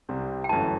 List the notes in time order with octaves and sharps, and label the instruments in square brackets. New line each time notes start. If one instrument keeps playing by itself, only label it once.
[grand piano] C2 C3 G3 C4
[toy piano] G5
[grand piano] G1 F#2 E3 A3 E4 [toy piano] A5